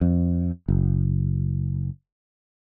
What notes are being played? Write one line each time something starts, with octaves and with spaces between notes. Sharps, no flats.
F2
F#1